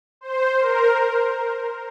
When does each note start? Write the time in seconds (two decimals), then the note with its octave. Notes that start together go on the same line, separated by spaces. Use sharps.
0.21 C5
0.60 A#4